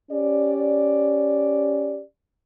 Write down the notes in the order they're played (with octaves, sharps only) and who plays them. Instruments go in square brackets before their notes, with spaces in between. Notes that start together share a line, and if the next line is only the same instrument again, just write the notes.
[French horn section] C#4 G4 D5